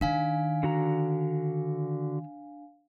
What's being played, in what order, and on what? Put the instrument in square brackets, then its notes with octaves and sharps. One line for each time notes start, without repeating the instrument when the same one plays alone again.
[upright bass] D#3 [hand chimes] D4 F5 G#5
[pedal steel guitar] D3 F#4 A#5